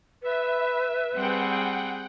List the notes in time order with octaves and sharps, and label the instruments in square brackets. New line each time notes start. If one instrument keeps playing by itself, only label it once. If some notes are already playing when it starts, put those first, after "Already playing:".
[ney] B4 [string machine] E5
[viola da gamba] G3 C4 G#4 [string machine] F#5 G5